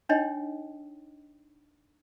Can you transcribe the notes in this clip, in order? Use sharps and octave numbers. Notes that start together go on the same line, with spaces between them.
D4 D#4 C#5 D#5 G5